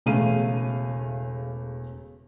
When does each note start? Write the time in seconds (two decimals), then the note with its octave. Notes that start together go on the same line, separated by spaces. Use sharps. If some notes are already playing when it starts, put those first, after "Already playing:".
0.06 E1 E2 C#3 A3 F5 D#7